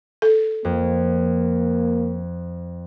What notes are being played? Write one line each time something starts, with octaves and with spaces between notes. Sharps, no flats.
A4
F2 A#3